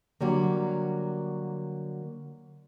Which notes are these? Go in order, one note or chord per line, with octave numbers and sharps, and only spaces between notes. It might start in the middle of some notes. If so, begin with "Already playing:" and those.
D3 F#3 G3 A#3